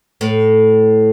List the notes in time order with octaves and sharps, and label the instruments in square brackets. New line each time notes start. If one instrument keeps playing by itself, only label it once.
[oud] A2